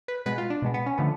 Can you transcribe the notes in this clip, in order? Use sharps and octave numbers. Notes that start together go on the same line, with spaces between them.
B4
B2 G#3 B3 B4
F4
D4
B2 G#3 B3
B3
C#4
D3 F3 A3 B3